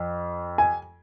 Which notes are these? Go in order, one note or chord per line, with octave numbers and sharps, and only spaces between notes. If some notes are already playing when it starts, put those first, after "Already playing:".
Already playing: F2
G#5